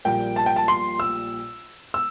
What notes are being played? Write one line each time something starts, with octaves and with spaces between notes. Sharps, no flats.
A#1 A#2 G3 A#3 G5
A5
G5
A5
C6
E6
E6